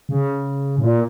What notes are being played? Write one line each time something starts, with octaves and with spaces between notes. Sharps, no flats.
C#3
A2
A#2